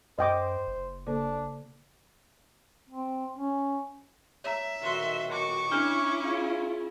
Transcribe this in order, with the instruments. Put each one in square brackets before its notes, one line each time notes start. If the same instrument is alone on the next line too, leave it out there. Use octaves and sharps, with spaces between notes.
[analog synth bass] F#2 [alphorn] C5 [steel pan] D#5 G5 D6
[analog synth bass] F#1
[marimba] C#3 A#3 A4 [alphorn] D4
[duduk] C4
C#4
[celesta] C#5 A#5 [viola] E5
[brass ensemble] B1 A#2 D#3 [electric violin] F#4 C6
[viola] F#4 [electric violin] C#6 D6
[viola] C#4 E4 [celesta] D4 F6 G7
[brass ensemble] F4 G#4